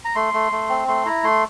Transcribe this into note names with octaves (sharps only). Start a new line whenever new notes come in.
A#5
A3 C6
A3
A3
C4
A3 C6
E4 A#5
A3 C6